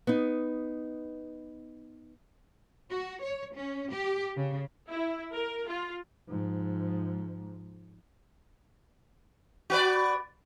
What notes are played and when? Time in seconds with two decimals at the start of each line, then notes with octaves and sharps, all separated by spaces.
0.07 B3 D#4
2.90 F#4
3.23 C#5
3.56 C#4
3.92 G4
4.36 C#3
4.88 E4
5.32 A#4
5.68 F4
6.28 G#2 F3
9.70 F#4 B4 D5